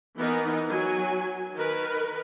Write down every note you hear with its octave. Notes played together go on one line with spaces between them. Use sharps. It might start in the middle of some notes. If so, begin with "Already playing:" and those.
E3 B3 D#4 A#4
F#3 G#5
D#3 A#4 B4